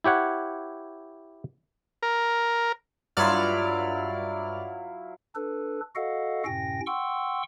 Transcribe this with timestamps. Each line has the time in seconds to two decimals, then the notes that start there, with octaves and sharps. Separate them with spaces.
0.04 E4 G4 C#5 F#5
2.03 A#4
3.17 G2 F#3 E4 F4 D5 F6
5.35 D4 A4 B4
5.96 F#4 A4 D#5 F5 F#5
6.46 F#2 A2 C3 C#4 G5 A#6
6.87 F#5 G5 C6 C#6 E6